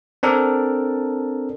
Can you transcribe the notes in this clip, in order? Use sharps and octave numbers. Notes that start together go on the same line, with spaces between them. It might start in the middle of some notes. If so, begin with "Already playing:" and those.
C4 D4 A4 A#4